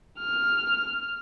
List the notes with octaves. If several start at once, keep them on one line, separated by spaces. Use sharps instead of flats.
F6